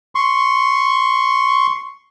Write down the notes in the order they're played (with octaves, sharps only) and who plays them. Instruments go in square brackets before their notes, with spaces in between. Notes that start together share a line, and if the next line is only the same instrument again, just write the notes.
[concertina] C6 C#6